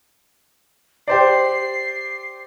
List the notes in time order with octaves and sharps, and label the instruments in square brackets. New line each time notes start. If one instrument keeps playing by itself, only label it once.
[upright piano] G4 C5 D5 [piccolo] C7